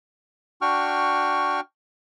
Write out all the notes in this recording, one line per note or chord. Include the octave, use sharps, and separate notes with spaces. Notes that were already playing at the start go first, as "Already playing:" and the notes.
D4 F#4 G5 C#6 F6